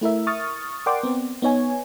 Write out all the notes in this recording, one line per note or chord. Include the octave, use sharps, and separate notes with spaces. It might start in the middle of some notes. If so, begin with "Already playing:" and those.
A3 E4 A#4 E5
C#6 D#6 F6 A6
A#4 D5 F#5 G5 C6 D6
B3 C4
B3 D#4 C#5 G#5